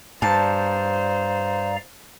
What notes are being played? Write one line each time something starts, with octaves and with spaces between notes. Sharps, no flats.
G2 C5 D5 F5 A5 A#5